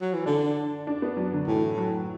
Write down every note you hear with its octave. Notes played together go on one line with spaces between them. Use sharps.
F#3
E3
D3 D4
D4
B3
F#3
D3
A2 E3
F#3